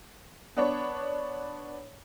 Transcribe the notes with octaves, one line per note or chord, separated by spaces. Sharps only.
B3 D4 C#5